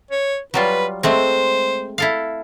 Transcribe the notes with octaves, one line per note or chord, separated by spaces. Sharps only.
C#5
F#3 G3 F4 B4
G#3 A3 C4 C5
E4 A4 F5